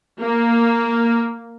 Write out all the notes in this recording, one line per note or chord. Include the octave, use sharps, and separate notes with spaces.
A#3